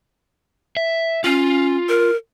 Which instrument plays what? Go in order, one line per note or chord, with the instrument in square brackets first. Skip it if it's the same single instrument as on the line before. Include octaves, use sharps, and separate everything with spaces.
[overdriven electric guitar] E5
[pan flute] C#4 [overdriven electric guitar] F4
[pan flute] A#4